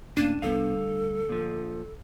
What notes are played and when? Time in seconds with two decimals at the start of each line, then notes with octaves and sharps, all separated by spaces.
0.17 D#1 A2 A#3 C#4 D4 D#7 E7
0.42 C2 F3 G3 B3 A4 F5
0.74 D2
1.29 A#2 F3